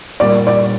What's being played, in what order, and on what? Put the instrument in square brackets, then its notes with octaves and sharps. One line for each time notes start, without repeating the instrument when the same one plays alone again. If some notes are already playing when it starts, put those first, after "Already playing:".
[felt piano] A#2 G3 A#3 [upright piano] D5
[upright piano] D5